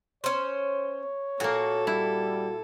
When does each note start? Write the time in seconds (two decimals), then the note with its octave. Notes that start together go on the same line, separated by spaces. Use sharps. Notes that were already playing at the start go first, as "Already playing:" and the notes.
0.24 C#4 C5 C#5
1.40 A#2 A#3 F#4 A4
1.87 G3 E4